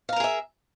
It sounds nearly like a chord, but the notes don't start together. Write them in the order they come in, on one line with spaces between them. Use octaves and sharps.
F5 A#5 A#4 G#4 E5